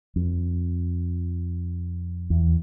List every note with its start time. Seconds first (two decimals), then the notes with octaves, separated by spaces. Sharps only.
0.16 F2
2.30 E2